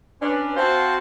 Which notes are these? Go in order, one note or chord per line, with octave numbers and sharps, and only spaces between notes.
C#4 D4 B4
C4 F#4 C5 F5 F#5 A5